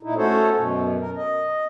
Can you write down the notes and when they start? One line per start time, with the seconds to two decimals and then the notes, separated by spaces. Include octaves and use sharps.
0.03 A#2 D#4 E4
0.16 A3 C#4 F#4 A4 C5 C#5
0.56 F#2 B2
1.00 A#4
1.16 D#5